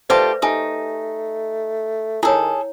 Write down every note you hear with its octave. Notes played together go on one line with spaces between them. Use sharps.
A3 F4 G4 B4 C5 D5 E5 A5
A3 D#4 G4 G#5
D#3 E4 G#4 A4 C#5